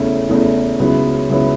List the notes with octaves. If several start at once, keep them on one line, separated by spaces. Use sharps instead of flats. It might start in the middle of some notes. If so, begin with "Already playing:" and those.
Already playing: E2 C#3 A3 E4
E2 C#3 A3 E4
C#2 C#3 F#3 B3 E4
C#2 C#3 F#3 B3 E4